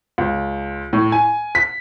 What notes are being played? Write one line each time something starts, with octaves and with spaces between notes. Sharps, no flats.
C#2
A2
G#5
B6